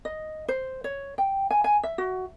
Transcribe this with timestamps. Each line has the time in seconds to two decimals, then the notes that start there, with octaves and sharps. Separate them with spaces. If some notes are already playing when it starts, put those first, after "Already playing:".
0.05 D#5
0.48 C5
0.84 C#5
1.18 G5
1.51 G#5
1.64 G#5
1.83 E5
1.98 F#4